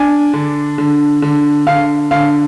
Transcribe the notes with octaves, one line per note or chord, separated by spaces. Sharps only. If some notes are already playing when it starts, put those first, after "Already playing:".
Already playing: D4 G#5
D3
D3
D3
D3 F5
D3 F5